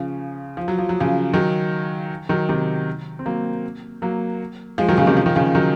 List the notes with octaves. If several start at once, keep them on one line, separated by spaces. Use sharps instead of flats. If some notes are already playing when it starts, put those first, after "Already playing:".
Already playing: C#3 F3
F3
F#3
F3
F#3
C#3 F3
D#3 F#3
D#3 F#3
C3 D#3
C4
F#3 A#3
F#3 A#3
F3 G#3
D#3 F#3
C#3 F3
C3 D#3
F3
D#3
C#3 F3
D#3 F#3